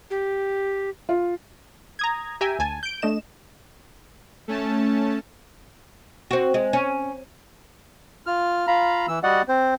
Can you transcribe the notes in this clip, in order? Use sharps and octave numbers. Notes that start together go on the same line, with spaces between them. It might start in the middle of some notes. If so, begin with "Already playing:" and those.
G4
F4
A#5 D#6 G#6
G4 E5 G5 G#5 A#5
D2 G#5 A5 G#6
G6 D7
A3 D4 D#5 E7
A3 C#4 A5
C4 F#4
G#3
C#4
F4 F6
F4 F5 A#5 B5
E3 E6
G3 F#4 D5 D#5 F#5
C4 C5